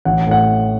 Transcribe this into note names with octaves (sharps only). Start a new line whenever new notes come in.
A1 F#5
A2 F#5